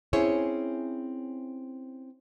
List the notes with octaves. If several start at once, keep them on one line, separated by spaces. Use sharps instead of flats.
C4 C#4 E4 G#4 C5 C#5